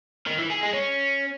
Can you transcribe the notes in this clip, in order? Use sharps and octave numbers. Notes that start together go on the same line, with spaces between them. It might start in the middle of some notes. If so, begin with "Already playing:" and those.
D#3
E3
G#4
G#3
C#4